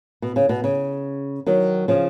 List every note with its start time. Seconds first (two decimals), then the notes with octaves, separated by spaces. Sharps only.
0.22 B2
0.36 C#3
0.49 B2
0.64 C#3
1.46 D#3 F#3
1.88 C#3 F3